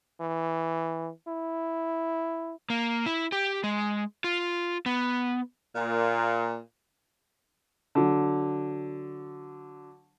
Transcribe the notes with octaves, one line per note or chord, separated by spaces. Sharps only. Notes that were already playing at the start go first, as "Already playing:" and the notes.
E3
E4
A#3
E4
G4
G#3
F4
B3
A#2
D3 F#3